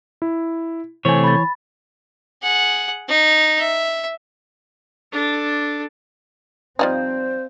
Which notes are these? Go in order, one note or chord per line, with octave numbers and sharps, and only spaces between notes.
E4
C3 E3 A3 C5 C#5 G#5
B5 A6
G#4 F#5
D#4
E5
D4 A4
F3 G3 C4 D#4 C5 D5 F5 A5